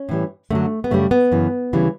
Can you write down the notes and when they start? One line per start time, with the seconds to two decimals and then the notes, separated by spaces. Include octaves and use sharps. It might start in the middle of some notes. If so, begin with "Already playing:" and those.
Already playing: C#4
0.09 A2 E3 G3
0.50 F#2 D3 F#3 A3
0.84 B3
0.90 F#2 C#3 G3 A3
1.11 B3
1.32 F#2 C#3 E3
1.73 D2 C#3 E3 G3